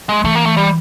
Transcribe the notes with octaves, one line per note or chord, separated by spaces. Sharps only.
G#3
E3 A3
A#3
A3
G3